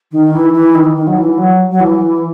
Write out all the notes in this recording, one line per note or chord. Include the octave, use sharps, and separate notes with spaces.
D#3
E3
E3
D#3
D#3
F#3
E3
F#3
F#3
E3